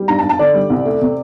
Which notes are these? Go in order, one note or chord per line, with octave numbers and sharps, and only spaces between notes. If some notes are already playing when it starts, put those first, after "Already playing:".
Already playing: G3
G2 A#5
A5
G2
A5
D3 D5
G3
C2
A3
C3